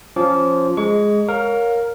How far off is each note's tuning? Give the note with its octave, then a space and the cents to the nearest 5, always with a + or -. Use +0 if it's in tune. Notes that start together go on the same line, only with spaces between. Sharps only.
F3 +0 C#4 +0 D6 -25
G#3 +0 A#5 +0 C#6 +35
A#4 +0 C#5 +0 F5 +25